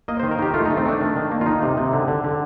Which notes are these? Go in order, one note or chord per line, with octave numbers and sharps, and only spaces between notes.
A#3 D#5
C5
D#3
A#4
D#3 G4
A3 F4
D#4
A3
C4
A3 D4
D#3
D#3
A#3
F4
D#3 D#4
C3
C3
D3
D3
D3